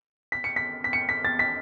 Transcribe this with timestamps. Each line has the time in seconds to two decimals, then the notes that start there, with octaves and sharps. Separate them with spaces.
0.32 B6
0.44 C#7
0.56 B6
0.84 B6
0.93 C#7
1.09 B6
1.25 A6
1.39 B6